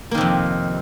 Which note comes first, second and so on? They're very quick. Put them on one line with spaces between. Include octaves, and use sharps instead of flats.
A#3 D#3 C3 F2